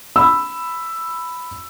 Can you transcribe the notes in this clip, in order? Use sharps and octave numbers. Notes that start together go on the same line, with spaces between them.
B5 E6